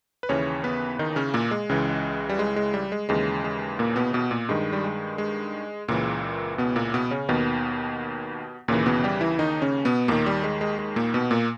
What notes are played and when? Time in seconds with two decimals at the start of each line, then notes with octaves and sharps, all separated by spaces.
0.23 B4
0.29 D#2 C#3 E3 C#4 C#5
0.64 B3 B4
0.99 D#3 D#4
1.16 C#3 C#4
1.34 A#2 A#3
1.51 G#3
1.69 C#2 C#3 E3
2.29 G3
2.39 G#3
2.56 G#3
2.74 G3
2.92 G#3
3.09 D#2 C#3 E3 G#3
3.44 G#3
3.79 A#2 A#3
3.96 B2 B3
4.13 B2 B3
4.31 A#2 A#3
4.49 G2 D#3 G#3
4.73 G3
4.84 G#3
5.18 G#3
5.88 C#2 A#2 C#3 E3 A#3
6.58 B2 B3
6.76 A#2 A#3
6.94 B2 B3
7.11 C#3 C#4
7.29 D#2 B2 D#3 B3
8.68 D#2 A#2 C#3 E3 A#3
8.86 B2 B3
9.04 G3 G4
9.21 E3 E4
9.39 D#3 D#4
9.62 C#3 C#4
9.85 B2 B3
10.08 D#2 A#2 D#3 A#3
10.26 G3
10.44 G#3
10.61 G#3
10.79 G#3
10.96 A#2 A#3
11.14 B2 B3
11.31 A#2 A#3